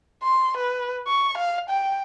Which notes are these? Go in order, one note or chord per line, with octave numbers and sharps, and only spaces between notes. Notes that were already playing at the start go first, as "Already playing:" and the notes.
C6
B4
C#6
F5
G5